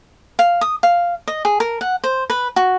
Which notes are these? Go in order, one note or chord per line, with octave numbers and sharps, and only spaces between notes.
F5
D#6
F5
D#5
G#4
A#4
F#5
C5
B4
F#4